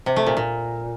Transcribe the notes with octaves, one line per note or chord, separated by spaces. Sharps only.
C3
A3
A#2
A#2